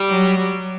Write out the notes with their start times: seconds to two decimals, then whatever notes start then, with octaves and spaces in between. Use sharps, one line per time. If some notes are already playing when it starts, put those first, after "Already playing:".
Already playing: G3
0.09 F#3